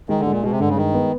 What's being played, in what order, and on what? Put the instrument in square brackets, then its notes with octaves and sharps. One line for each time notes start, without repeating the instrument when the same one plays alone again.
[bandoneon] D#3 [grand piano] G#3
[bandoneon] D3
[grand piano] G#3
[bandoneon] A#2
[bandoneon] B2 [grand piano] G#3
[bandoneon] C3
[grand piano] G2 [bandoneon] D3
[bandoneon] C#3
[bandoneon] D#3 [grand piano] G#3
[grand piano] B3